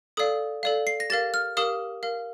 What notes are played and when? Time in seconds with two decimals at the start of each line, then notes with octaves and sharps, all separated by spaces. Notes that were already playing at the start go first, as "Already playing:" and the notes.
0.17 A4 D5 F5 D#6
0.63 A4 D5 F5
0.87 C7
1.00 A#6
1.10 G4 A#4 F5 A6
1.34 F6
1.57 G4 A#4 F5 D#6
2.03 A#4 F5